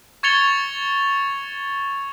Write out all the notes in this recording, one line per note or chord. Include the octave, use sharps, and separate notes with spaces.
C#6 G#6 A6 C#7 F7 G7